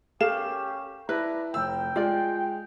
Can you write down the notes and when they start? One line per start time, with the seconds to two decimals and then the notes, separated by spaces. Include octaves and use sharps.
0.21 C#4 G4 A4 A#4 F5 E7
1.09 E4 B4 D5 A5 A#5
1.54 F1 G5 E6
1.96 G#3 F4 D5